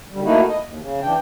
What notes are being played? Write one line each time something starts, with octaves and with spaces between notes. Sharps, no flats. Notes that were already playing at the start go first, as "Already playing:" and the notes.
D3 G3
A3 A#3 D#4 E4 F#4
D#5
D#2
C#3
E3 D4 G5